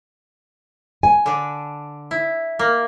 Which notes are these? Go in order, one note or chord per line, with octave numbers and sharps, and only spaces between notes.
G#5
D3 D4
E4
A#3